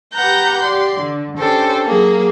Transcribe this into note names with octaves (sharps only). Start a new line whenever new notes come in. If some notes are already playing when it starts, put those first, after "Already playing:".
G4 B4 F#5 A#5 G6
G4 D5 C6
D3
C#4 D4 G4 A4 C5 G5
F#3 A#3 G#4